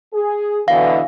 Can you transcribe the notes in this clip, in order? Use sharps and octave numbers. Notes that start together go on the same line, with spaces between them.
G#4
B2 D3 E3 F5